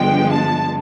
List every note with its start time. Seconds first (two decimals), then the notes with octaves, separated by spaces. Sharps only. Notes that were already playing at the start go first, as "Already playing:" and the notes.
Already playing: G2 D3 F3 G#3 B3 G5
0.30 A5